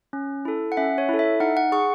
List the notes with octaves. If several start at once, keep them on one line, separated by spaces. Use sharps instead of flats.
C#4
E4 A4
F#5
C#4 E5
C#5
E4 A4
E5
D#4 F#5
F#5
G#4 C#6